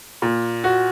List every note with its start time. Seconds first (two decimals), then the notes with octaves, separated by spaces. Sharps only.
0.22 A#2
0.64 F#4